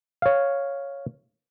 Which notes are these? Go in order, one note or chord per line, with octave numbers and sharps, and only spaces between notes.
C#5 F5